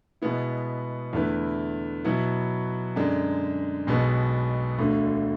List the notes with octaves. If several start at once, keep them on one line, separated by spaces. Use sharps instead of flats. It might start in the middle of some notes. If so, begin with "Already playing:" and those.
B2 G#3 B3 E4
E2 D3 A3 E4 B4
B2 F#3 B3 E4
F#2 D3 G#3 D4
B1 B2 G#3 B3
E1 D2 D3